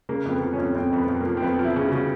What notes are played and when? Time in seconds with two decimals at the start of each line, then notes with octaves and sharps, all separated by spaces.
0.09 C#3 A#3
0.26 F2
0.31 B3
0.42 F3
0.53 C#4
0.59 F2
0.75 F2 C4
0.92 F2
0.97 B3
1.09 F2
1.21 A#3
1.26 F3
1.37 C4
1.42 F2 B3
1.59 F3
1.64 E4
1.76 C#3
1.86 F#4
1.92 C#3